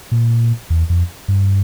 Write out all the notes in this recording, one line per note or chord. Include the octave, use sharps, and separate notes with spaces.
A#2
E2
F2
G2